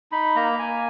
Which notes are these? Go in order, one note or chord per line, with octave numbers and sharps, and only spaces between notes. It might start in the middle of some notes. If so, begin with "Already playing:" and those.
D#4 B5
A#3 A#5
A#3 G#5